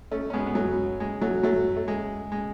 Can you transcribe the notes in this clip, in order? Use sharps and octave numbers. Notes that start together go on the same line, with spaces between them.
A3 C#4
C#4
G#3 B3
B3
F#3 A3
G#3
F#3 A3
F#3 A3
A3
G#3
G#3